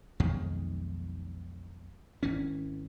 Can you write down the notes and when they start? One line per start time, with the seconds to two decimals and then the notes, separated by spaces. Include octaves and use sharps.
0.20 B1 F2 D#3 G#3
2.23 G#1 E3 C#4